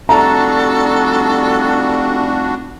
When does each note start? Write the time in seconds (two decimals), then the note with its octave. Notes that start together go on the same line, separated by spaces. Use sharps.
0.09 F1 G3 D4 F#4 A4 E5 A5 A#5